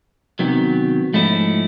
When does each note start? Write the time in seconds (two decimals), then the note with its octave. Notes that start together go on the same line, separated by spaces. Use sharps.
0.39 C3 D#3 F#3 B3
1.13 G#2 F3 A3 C#4 E4